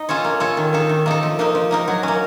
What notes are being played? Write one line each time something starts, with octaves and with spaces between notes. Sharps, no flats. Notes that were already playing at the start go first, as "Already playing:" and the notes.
Already playing: D#4 D#5
C#4 F4 A4 C#5
A#3
C#4 F4 A4 C#5
D#3
A#3 D#4 A4
D#3
A#3 D#4 A4
F3
A#3 D#4 A#4
F3
A#3 D#4 A#4
F#3
A#3 C#4